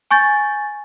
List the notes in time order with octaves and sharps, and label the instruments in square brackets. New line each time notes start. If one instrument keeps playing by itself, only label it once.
[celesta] G#5 C#6 G6 A6